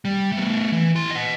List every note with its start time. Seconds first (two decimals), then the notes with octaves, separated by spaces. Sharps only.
0.05 G3
0.32 A3 B3
0.72 E3
0.95 E4 C6
1.11 D#5 F#5